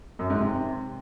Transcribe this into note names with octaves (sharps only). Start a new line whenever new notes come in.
F#2
G#2
C3